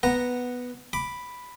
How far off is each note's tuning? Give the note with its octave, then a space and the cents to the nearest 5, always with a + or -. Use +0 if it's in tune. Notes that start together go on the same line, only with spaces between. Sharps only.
B3 +0 F#5 +0 A#5 +0
B5 +0 D6 +0